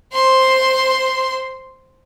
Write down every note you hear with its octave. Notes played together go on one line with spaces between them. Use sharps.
C5 C6